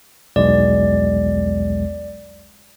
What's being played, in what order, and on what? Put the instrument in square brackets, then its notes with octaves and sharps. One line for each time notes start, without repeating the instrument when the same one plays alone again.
[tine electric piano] B1 E2 G#3 [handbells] D5